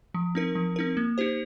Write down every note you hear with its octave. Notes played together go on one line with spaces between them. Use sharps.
F3
C4 D#4 A#4
F3
C4 D#4 A#4
A#3
D#4 G4 C5